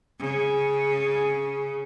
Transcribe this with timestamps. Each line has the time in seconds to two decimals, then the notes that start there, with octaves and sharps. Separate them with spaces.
0.20 C#3